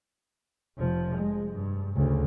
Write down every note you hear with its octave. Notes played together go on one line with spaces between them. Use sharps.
F1 F3
G#3
G2
D2 C#3